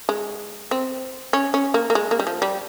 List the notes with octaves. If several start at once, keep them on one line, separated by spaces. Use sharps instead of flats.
G#3
C4
C#4
C#4
A#3
A#3
G#3
A#3
G3
F3
G3